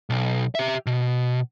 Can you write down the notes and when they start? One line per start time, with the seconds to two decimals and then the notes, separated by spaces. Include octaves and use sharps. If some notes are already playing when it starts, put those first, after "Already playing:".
0.10 B1
0.55 G4 E5
0.86 B2